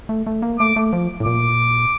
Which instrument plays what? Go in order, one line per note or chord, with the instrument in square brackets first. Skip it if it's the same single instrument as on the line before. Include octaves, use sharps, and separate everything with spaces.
[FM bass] A3
A3
A#3
[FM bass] A3 [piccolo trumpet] D6
[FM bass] A3
F3
A2
[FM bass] A#2 [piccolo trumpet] D6